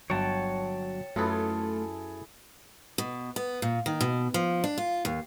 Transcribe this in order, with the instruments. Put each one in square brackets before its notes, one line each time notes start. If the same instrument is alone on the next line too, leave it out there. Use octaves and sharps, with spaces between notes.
[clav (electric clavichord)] G1 F#4 [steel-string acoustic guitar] F#3 [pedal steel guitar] C#5 G5 A5
[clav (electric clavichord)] F#2 B4 [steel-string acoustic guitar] A3 F4 [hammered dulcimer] E4 G#4 A4
[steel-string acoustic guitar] B2
B3
A#2
D#3
B2
F3
D4
F4
D#2